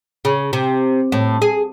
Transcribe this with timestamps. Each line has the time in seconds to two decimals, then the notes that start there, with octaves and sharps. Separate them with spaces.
0.25 C#3
0.53 C3
1.12 A2
1.42 G#4